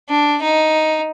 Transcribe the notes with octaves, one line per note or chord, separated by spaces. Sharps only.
D4
D#4